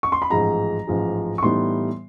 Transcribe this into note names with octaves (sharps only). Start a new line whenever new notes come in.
C#6
C6
B5
A1 G#2 F3 G#3 A#5
A1 G#2 F3 G#3
C#6
A2 E3 G3 B3 D#4 C6